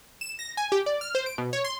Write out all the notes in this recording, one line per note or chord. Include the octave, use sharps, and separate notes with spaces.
E7
A#6
G#5
G4
D5
F6
C5
D7
B2
C#5
C6